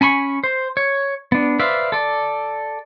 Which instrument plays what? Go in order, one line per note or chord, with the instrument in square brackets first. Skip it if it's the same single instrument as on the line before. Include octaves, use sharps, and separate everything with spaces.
[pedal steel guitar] C#4 G#5 B5 C#6
C5
C#5
B3 D4
B4 C5 D5 E5 F5
A4 D5